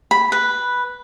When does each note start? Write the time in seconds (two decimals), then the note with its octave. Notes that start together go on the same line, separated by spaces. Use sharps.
0.11 B5
0.32 B4